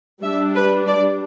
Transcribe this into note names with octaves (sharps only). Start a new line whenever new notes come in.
G3 D4 E5
B4
D5